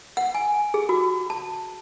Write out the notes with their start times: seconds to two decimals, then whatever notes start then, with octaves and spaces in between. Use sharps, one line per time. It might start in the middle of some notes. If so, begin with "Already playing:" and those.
0.17 F#5
0.34 G#5
0.74 G#4
0.89 F#4
1.30 A5